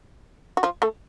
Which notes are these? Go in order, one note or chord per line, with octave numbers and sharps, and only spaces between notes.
F#4
F3 F4
A3 A4